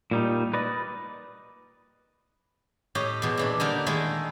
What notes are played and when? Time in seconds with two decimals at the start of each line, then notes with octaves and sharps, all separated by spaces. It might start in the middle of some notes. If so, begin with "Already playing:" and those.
0.11 A#2 G3 D#4
0.54 B4 D5 D#5
2.95 A2 G4 C#5 D#5
3.22 E2 B2
3.37 A#2 E3 D4
3.60 D3 G3 D#4 A#4
3.86 D#3 G#3 A3 E4